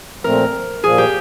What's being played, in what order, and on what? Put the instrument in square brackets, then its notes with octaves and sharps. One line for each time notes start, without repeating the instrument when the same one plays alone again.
[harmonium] A#2 F3 A3 C4 [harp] A#4
[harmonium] A#2 F3 A#3 [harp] G#4
[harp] G4